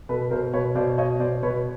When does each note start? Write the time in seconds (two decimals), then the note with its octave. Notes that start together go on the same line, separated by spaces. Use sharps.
0.09 B2 A4 B4
0.31 B2 A#4 C5
0.53 B2 B4 C#5
0.75 B2 C5 D5
0.98 B2 C#5 D#5
1.20 B2 C5 D5
1.43 B2 B4 C#5